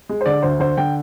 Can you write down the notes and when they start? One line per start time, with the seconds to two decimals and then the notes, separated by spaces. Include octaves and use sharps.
0.09 G#3
0.21 C5
0.26 D3 D5
0.43 D2 C5
0.60 D3 C5
0.77 D3 G5